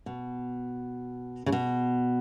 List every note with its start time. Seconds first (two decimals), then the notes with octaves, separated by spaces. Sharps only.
0.06 B2
1.46 C#3
1.52 B2